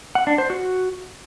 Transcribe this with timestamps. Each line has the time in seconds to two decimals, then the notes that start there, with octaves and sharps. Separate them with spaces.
0.15 F#5
0.27 D4
0.38 C5
0.50 F#4